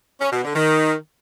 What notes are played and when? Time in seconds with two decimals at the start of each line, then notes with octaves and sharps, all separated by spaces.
0.21 C#4
0.33 B2
0.44 D3
0.56 D#3